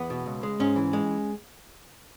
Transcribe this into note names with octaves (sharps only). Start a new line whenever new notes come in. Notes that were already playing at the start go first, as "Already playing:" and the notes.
Already playing: E2 B3
B2
C#2
G#3
G#2 C#4
E3
G#3